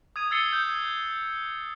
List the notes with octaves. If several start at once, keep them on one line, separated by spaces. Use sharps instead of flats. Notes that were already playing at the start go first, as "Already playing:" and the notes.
D#6 G#6 D#7
E6 G#6 A6 C7 C#7 G7
G6